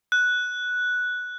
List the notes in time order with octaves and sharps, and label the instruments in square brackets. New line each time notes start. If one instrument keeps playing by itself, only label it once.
[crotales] F#6